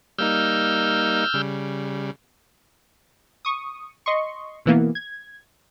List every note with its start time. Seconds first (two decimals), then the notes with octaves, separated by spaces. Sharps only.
0.18 G3 A#3 D#4 E6 F6 G6
1.34 C#3 G3
3.45 C#6 D#6
4.06 D#5 C6 C#6
4.66 B2 E3 A#3 B3
4.95 G#6